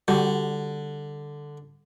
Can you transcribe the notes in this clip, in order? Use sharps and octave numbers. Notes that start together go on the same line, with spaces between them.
D3 G3 F#4